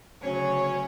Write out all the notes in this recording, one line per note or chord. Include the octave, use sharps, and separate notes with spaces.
D2 C#3 F#3 C#4 C#5